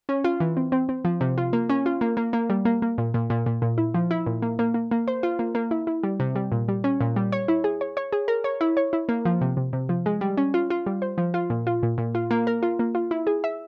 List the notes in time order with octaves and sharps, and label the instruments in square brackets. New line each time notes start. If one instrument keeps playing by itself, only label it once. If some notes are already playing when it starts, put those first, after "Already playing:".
[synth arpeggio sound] C#4
F4
E3
C4
C4
C4
F3
C3
F4
A#3
C#4
F4
A#3
A#3
A#3
G3
A#3
A#3
A#2
A#2
A#2
A#2
A#2
E4
F3
E4
A#2
A#3
A#3
A#3
A#3
C5
F4
A#3
A#3
E4
E4
G3
C3
G3
A#2
G3
C#4
A#2
G3
C#5
E4
G#4
C#5
C#5
G#4
A#4
C#5
E4
C#5
E4
A#3
F3
C3
C3
C3
F3
G#3
G3
C#4
F4
F4
G3
C5
F3
F4
A#2
F4
A#2
A#2
F4
A#3
A#4
F4
A#3
F4
E4
G#4
E5